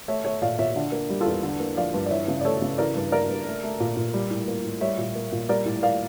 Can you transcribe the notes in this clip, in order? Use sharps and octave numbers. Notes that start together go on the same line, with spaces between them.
A3 C#5 E5
A3 C#5 E5
A#2 D5 F5
A#2 C#5 E5
D3
A#3
G3
F4 A4
E2
D3
A#3
F3 D5 F5
G2
D5
E3 C#5 E5
C#3
D5
A3 A4 C#5
C#3
E3 A#4 D5
G2
A#3 A#4 D5
G2
A3
A3
A#2
A#2
G3
A2
A#3
A2
G3 C#5 E5
A#2
A#3
A#2
G3 A#4 D5
A2
A#3 D5 F5